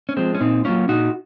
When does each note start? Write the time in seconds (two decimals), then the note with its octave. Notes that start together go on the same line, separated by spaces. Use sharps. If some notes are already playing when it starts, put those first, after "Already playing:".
0.09 C#4
0.17 F3 G#3 C4
0.35 C#4
0.41 A#2 C4 D#4
0.65 F#3 A#3 C#4 F4
0.88 A#2 D#4 F#4